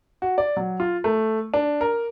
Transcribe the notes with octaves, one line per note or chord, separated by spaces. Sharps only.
F#4
D5
F#3
F4
A3
D4
A#4